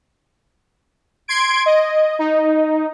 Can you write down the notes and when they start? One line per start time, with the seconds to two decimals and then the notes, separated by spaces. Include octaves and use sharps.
1.28 C6 G#6 D7
1.66 D#5
2.19 D#4